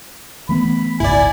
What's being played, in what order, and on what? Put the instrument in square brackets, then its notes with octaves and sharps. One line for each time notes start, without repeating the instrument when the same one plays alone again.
[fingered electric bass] E3 A3 B3 [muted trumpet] B5
[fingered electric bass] F#1 C#2 G#2 [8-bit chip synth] E4 D5 [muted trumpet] G#5